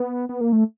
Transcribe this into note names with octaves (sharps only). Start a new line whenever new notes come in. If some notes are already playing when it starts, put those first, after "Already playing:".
Already playing: B3
B3
A#3
A3